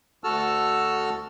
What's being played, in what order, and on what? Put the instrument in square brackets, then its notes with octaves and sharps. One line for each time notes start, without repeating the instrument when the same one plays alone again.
[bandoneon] D2 F#4 A4 A5 E6 F6